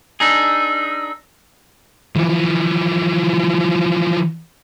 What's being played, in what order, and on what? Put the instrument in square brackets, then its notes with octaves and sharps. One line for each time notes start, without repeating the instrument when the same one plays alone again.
[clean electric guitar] D4 D#4 G#4 [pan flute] E6
[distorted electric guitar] E3 F3